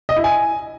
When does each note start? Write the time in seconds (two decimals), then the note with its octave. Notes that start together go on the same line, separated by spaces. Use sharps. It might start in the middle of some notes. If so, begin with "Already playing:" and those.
0.09 D#5
0.16 E4
0.24 G#5